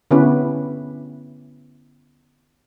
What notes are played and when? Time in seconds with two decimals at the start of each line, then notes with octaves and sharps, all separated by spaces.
0.11 D3 B3 C#4 E4 G4 B4